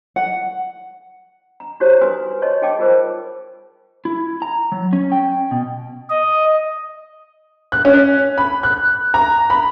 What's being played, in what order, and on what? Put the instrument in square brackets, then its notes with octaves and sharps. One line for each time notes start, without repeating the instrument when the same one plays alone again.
[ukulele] F#5
[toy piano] A#5
D#4 E4 F#4 G4 C5 C#5
F#4 B4 G#5 C6 D#6
C#5 D#5 A5 C6 C#6
D#4 G#4 D#5 G5 A5 D6
F4 G#4 A#4 C5
[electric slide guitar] E4
A#5
F#3
C#4
G5
B2
[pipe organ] D#5
[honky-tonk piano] F#6
C#4
B5
F#6
A#5
B5